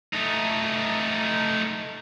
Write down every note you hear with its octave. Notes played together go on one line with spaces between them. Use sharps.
A3 D#4